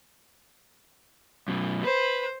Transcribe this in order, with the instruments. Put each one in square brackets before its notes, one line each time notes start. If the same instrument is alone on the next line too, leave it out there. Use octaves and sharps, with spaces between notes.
[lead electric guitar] F#2 B2
[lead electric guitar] B4 [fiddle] C5